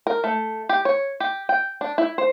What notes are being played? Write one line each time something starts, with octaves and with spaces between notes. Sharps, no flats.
A#4
A3
G4
C#5
G4
G5
D4
E4
C5